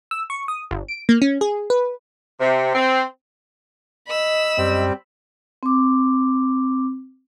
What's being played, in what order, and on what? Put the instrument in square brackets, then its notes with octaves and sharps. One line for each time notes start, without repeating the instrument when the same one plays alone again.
[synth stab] E6
C#6
D#6
G1
D7
A#3
C#4
G#4
B4
[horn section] C3
C4
[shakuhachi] D#5 [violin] B5 E6
[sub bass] F#2 [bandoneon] G3 C4
[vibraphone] C4 D6